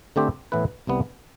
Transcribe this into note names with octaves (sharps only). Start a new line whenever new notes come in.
D3 A3 C4 G4 C5
A2 E3 B3 E4 B4
C2 C3 G3 B3